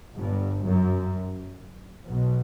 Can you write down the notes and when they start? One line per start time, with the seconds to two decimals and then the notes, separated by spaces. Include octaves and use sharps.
0.17 G1 G2
0.65 F#2
2.06 B1 B2